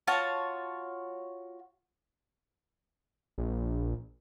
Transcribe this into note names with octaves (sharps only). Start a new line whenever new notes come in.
F4 F#4 C#5 A5
A#1